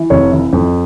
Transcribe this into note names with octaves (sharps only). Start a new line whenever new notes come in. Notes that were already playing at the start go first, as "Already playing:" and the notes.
Already playing: E3
F1 C#5
E3
F2